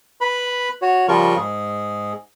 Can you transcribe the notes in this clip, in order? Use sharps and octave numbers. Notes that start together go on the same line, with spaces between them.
B4 B5
F#4 C#5
C#3 F3 G3 F4 A#4 C#6
G#2 G#4